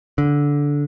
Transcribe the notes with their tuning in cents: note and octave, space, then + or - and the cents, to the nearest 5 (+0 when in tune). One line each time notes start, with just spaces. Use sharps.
D3 -15